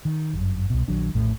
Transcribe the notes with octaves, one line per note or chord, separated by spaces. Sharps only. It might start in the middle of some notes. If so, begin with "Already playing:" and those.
D#3
G1 F#2
C2 B2
A#1 D#3 F#3 D4
D#1 A#1 A2 A3